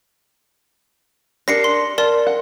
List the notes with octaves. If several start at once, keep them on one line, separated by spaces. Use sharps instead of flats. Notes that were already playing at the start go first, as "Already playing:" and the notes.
D4 G4 A#4 A#6 C7 C#7
C6
A#4 D5 A5 C6
F#5